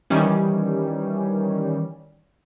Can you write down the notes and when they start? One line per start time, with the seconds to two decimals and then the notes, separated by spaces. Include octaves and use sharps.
0.10 D#3 E3 G3 C#4